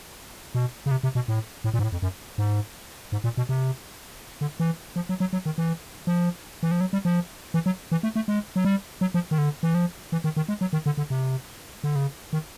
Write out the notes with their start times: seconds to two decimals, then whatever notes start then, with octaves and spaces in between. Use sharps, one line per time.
0.55 B2
0.86 C#3
0.91 C3
1.03 C3
1.15 B2
1.28 A2
1.64 A2
1.74 A#2
1.79 G#2
1.83 A2
1.92 F2
2.02 F#2
2.38 G#2
3.12 G#2
3.24 A#2
3.37 B2
3.49 C3
4.41 D3
4.60 E3
4.96 F3
5.09 F#3
5.20 F#3
5.33 F#3
5.46 D#3
5.58 E3
6.07 F3
6.63 E3
6.71 F3
6.81 F#3
6.93 G3
7.05 F3
7.54 E3
7.66 F#3
7.92 E3
8.03 A3
8.16 A3
8.28 G#3
8.56 F#3
8.65 G3
9.01 F#3
9.14 F3
9.31 D#3
9.38 D3
9.63 E3
9.75 F3
10.12 E3
10.24 D#3
10.37 D#3
10.48 G#3
10.61 F#3
10.73 D#3
10.86 D3
10.97 D3
11.10 C3
11.84 D3
11.96 C#3
12.33 D#3